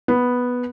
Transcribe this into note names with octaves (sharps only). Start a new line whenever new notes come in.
B3